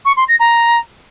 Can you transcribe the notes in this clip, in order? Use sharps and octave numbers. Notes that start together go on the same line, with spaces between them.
C#6
C6
A#6
A#5